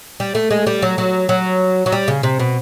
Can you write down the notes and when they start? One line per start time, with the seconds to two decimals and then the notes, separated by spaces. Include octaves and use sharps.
0.20 G3
0.35 A3
0.51 G#3
0.67 G3
0.82 F#3
0.98 F#3
1.29 F#3
1.86 F#3
1.92 G3
2.08 C#3
2.23 C3
2.39 B2